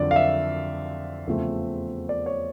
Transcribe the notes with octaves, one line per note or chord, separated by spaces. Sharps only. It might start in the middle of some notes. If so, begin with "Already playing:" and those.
Already playing: F2 D3 F#3 D5
F5
E5
E2 C#3 F3 A3 C4
D5
C#5